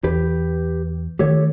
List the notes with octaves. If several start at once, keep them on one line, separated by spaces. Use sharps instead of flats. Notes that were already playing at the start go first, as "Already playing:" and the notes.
E2 G4 B4
D#3 A3 G4 A4 C#5